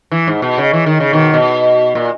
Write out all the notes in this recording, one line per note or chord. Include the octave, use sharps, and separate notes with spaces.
E3
G#2
B2
C#3
E3
D#3
C#3
B2 D#3
B2
A#2